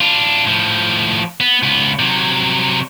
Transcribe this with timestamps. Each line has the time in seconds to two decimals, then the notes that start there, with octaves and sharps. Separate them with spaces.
0.01 D4 F4
0.47 A2 F3
1.40 B3
1.63 C#2 B3
1.99 C3 F#3